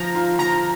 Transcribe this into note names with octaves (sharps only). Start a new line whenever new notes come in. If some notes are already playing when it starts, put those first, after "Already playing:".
Already playing: F3 A#5
F4
F3 A#5